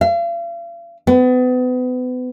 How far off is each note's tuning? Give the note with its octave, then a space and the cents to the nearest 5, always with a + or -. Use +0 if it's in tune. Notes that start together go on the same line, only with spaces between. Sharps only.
F5 -40
B3 +35